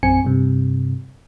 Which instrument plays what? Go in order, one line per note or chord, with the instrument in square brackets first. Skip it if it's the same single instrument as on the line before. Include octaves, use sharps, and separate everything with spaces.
[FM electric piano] A#1 F#2 C4 G#5 C#7
G2 C3